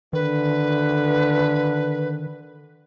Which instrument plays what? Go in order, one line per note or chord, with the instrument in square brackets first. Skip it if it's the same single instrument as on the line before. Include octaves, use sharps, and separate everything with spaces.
[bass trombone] D3 [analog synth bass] D#3 [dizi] B4